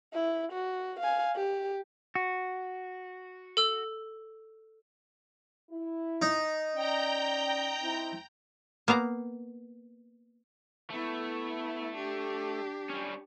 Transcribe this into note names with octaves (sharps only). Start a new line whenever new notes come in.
E4
F#4
F5 G#5
G4
F#4
A4 E6
E4
D#4
C#4 D5 G5 A#5 G6
C4 E4
A#3 B3 F5 A#5
A3 B3 E4
D4 G4
G3 C#4